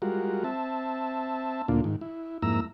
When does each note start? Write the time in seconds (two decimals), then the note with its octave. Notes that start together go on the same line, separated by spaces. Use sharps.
0.02 G3 G#3 F4 F#4 A#4
0.44 C4 E5 A5
1.68 D2 A#2 A#3 D4 F4
1.84 G#2 D#3
2.01 E4
2.42 F2 G#2 A#3 E4 A#5 E6